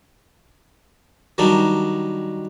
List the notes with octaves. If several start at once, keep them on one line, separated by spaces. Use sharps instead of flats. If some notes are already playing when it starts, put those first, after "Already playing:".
D#3 F#3 G3 D4 D#4